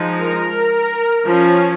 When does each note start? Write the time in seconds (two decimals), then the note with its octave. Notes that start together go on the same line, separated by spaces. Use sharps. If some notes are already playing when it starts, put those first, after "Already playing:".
Already playing: F3 G#3 D#4
0.20 A#4
1.26 F3 C#4